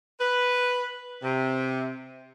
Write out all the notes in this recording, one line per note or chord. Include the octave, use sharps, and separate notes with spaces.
B4
C3